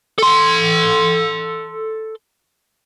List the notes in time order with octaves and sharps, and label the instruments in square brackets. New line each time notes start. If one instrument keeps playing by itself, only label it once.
[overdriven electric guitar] A4 C6